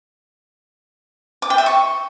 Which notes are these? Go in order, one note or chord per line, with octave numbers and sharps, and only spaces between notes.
D6
G5
E5
C#6